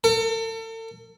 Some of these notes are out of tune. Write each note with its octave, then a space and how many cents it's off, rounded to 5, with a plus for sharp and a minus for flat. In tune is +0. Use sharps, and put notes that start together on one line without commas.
A4 +40